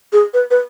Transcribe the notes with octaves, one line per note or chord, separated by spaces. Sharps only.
G#4
B4
B4